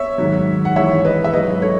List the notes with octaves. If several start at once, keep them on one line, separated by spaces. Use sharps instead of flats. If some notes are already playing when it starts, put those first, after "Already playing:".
Already playing: C#5 E5
G#2 D#3 F#3
F#5
G#2 E3 C#5 E5
B4 D#5
E5
G#2 F#3 B4 D#5
A4 C#5